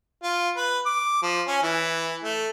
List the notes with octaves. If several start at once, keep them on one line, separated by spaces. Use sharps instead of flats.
F4
B4
D6
F3
C#4
E3
A3